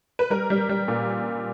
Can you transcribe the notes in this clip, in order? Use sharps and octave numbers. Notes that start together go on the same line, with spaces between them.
B4
G3 A#4
G3
G3
A#2